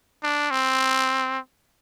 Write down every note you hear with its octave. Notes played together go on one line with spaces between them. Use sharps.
D4
C4